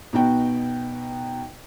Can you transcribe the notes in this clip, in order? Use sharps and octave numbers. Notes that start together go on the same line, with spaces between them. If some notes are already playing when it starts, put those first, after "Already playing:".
B2 B3 D#4 F#4 G5